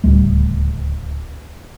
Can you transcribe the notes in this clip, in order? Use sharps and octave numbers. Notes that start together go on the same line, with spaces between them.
D1 C#2 G3 A3